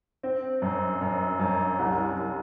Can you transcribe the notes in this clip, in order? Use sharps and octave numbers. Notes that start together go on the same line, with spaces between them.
C4
F#2
F#2
F#2
C2